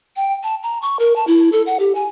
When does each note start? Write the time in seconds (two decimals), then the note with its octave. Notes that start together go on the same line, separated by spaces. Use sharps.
0.16 G5
0.43 A5
0.63 A#5
0.82 C#6
0.99 A#4
1.16 A5
1.27 E4
1.52 A4
1.66 F#5
1.80 G4
1.95 G#5